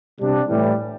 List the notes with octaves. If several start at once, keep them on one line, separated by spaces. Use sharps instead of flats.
C3 G3 D4
A2 E3 G3